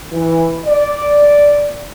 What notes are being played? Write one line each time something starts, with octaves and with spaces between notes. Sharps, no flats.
E3
D5